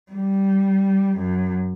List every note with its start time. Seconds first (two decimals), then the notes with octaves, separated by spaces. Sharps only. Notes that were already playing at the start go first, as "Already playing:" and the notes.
0.12 G3
1.17 F#2